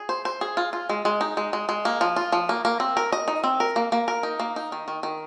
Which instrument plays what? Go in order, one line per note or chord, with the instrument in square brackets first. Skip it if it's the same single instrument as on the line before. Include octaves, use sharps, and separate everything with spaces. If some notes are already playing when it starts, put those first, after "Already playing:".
Already playing: [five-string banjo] G#4
C5
C5
G#4
F4
F4
G#3
G#3
D#4
G#3
G#3
G#3
A#3
F3
F4
F3
A#3
A#3
C4
A#4
D#5
D#4
C4
A#4
A#3
A#3
A#4
D#4
A#3
D#4
D#3
D#3
D#3